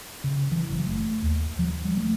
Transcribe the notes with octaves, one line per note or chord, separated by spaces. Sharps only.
C#3
E3
F#1
A3
D#2
F3
G3
A3